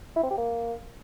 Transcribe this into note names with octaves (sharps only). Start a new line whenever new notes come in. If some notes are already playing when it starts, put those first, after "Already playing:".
E4
C4
G4
A#3